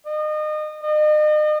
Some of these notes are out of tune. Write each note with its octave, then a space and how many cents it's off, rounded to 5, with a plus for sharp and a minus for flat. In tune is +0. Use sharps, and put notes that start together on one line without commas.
D#5 -30
D#5 -40